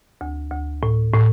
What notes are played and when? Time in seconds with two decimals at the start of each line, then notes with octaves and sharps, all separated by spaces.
0.21 D2
0.52 D2
0.83 A2
1.13 A2